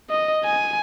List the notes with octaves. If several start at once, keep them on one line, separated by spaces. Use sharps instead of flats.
D#5
G#5